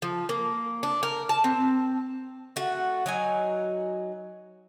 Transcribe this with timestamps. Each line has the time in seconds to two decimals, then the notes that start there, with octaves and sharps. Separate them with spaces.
0.02 F3
0.29 A#3
0.83 D4
1.03 A#4
1.29 A5
1.44 C4
2.56 A3 F#4
3.06 F#3 D#4 G#5